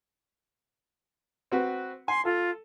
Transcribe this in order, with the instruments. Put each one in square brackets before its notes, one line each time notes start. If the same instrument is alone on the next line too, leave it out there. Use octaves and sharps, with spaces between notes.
[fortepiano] C4 F#4 B4
[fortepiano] G#5 [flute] C6
[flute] F4 [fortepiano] A4